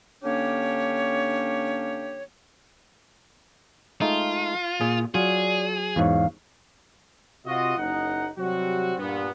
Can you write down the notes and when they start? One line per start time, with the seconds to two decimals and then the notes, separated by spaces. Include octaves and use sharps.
0.23 D3 A#3 C#4 D4 G4 C#5
4.01 G#3 A3 D#4 F4
4.81 A#2 G#4
5.15 F#3 F4 G#4 D5
5.96 E2 G#2 C#5 F5
7.46 C3 F4 F#4 D#5
7.78 F#1 D#4 F#5
8.38 C3 F#3 G3 C4 F#4
8.98 G2 A#2 B3